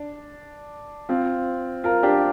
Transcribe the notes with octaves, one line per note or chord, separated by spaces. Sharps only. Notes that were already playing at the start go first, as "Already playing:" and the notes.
Already playing: D4
C4 F4
F4 A#4
D4 G4